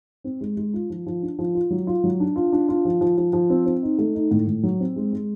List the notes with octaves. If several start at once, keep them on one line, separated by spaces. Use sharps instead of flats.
C4
G#3
G#3
F4
F3
F3
D4
F3
F4
F#3
F4
F#3
D4
F4
D4
F4
F3
F3
F3
F3
C4
C4
D#4
A3
D#4
A2
A2
F#3
C4
G#3
G#3